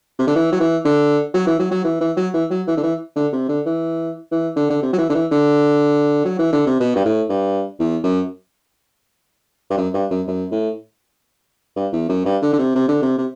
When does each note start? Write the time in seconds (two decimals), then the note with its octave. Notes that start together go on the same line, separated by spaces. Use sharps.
0.19 C3
0.27 D3
0.35 E3
0.52 F#3
0.60 E3
0.85 D3
1.34 F#3
1.47 E3
1.59 F#3
1.71 F#3
1.84 E3
2.00 E3
2.17 F#3
2.33 E3
2.50 F#3
2.67 E3
2.77 D3
2.83 E3
3.16 D3
3.33 C3
3.49 D3
3.66 E3
4.32 E3
4.56 D3
4.70 D3
4.82 C3
4.93 F#3
4.98 E3
5.09 D3
5.15 E3
5.31 D3
6.25 F#3
6.39 E3
6.53 D3
6.66 C3
6.80 B2
6.96 G2
7.05 A2
7.29 G2
7.79 E2
8.04 F#2
9.70 G2
9.77 F#2
9.94 G2
10.10 F#2
10.27 F#2
10.52 A2
11.76 G2
11.93 E2
12.09 F#2
12.25 G2
12.42 D3
12.53 D3
12.59 C3
12.75 C3
12.88 D3
13.02 C3
13.18 C3